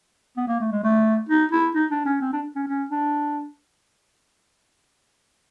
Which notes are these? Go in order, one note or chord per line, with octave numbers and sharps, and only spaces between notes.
B3
A#3
A3
G#3
A3
D#4
E4
D#4
D4
C#4
C4
D4
C#4
C#4
D4